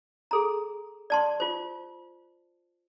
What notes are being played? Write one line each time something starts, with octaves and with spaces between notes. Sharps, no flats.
G#4 A4 A#5
D5 A5 C6
F4 C5